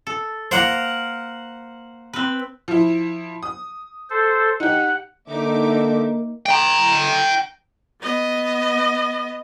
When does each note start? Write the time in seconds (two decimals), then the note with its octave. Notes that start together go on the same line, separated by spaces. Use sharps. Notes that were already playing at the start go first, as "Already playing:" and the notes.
0.07 A4
0.51 A#3 A#4 C5 F#5
2.13 C4 B4
2.68 F3 E4
3.43 D#6
4.10 A4 C5
4.60 D#4 G4 F#5
5.28 D3 A#3 D#4 E5 D6
6.46 G5 A#5
8.02 B3 D#5